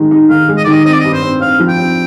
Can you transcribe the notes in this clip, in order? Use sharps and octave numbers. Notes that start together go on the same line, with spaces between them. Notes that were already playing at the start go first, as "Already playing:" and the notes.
Already playing: D#3 G#3 D#4
D#4
D#3 F5
G#3
D#5
D#3 D5
D#5
C4 D#5
D5
D#5
G2
C5
C4
C4 F5
F3
G5
C4